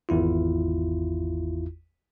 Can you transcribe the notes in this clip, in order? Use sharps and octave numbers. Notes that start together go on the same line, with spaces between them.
G#1 E2 E4 F4